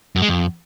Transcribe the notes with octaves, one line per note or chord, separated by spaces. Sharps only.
F#2
G#3
F2